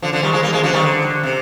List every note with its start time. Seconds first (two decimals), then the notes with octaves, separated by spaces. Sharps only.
0.02 D3 F3
0.13 D3 F3
0.23 D#3 G3
0.32 F3 G#3
0.42 G3 A#3
0.52 F3 G#3
0.63 D3 F3
0.73 D#3 G3
0.83 D3
1.23 C3